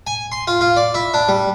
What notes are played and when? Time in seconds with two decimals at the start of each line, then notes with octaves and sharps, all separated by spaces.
0.07 G#5
0.32 C6
0.47 F4
0.61 F4
0.76 D5
0.94 E4
1.14 D4
1.28 G3